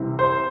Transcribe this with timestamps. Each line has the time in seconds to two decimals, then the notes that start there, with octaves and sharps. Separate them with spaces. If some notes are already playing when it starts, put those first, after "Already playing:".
Already playing: C2 C3 E3
0.19 C5